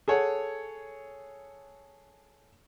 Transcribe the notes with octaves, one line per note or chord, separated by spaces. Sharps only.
G#4 A4 C#5 F#5